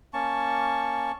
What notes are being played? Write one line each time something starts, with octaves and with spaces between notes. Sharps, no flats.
A#3 C#4 A5 C#6